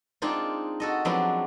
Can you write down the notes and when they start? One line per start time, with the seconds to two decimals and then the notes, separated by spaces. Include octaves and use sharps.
0.22 G#3 C4 D4 D#4 F4
0.80 F#4 A4 D#5
1.05 F3 F#3 G#3 B3 C4 D4